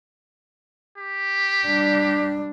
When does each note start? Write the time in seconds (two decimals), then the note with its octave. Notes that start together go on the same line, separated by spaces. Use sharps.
0.98 G4
1.67 G3 D4